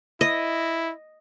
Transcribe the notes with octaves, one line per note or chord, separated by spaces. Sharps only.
E4 D#5